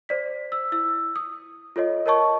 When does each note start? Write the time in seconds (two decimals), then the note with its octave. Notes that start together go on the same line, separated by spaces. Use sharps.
0.09 C5 D5 B6
0.52 E6
0.72 E4 E6
1.16 D#6
1.76 F4 A4 C#5 D#5
2.06 A#4 C#5 D#5 A5 C#6